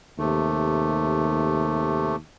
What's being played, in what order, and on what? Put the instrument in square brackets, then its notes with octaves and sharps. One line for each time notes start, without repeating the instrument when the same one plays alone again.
[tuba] D#2 [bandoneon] C3 A3